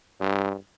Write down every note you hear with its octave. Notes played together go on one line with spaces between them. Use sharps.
G2